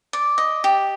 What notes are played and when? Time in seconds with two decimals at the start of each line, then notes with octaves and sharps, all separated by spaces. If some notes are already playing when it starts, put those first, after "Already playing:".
0.13 D5
0.38 D#5
0.64 G4